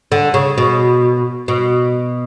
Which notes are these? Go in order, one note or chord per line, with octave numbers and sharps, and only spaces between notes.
D3
C#3
B2
B2